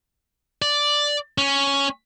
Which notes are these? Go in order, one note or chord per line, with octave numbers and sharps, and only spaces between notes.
D5
C#4